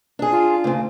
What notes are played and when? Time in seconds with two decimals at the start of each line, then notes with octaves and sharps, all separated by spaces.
0.19 D4 G#4
0.32 F4
0.64 D2 C#3